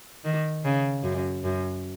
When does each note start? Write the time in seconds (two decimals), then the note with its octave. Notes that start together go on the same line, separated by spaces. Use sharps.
0.25 D#3
0.65 C#3
1.04 F#2
1.44 F#2